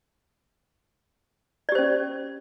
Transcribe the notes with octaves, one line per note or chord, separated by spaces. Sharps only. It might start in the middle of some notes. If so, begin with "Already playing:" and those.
C#4 G4 C5 D5